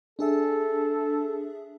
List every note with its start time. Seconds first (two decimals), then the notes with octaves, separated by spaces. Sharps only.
0.19 D4 G#4 A4 E5